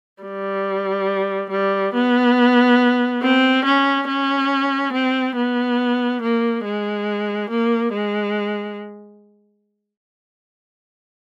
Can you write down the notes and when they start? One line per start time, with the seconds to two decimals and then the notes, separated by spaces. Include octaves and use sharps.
0.23 G3
1.51 G3
1.94 B3
3.22 C4
3.65 C#4
4.08 C#4
4.93 C4
5.36 B3
6.22 A#3
6.65 G#3
7.50 A#3
7.93 G#3